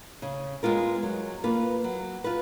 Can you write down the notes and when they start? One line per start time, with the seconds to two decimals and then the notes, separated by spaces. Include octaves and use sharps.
0.22 C#3
0.63 G#3 B3 F4 A#4
1.03 F#3
1.44 A#3 F4 B4
1.84 F#3
2.24 F4 B4